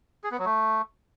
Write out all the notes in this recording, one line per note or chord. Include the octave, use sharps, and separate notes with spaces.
G#4
B3
F#3
A3